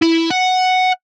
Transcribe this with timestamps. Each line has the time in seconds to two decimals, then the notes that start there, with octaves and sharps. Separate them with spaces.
0.02 E4
0.31 F#5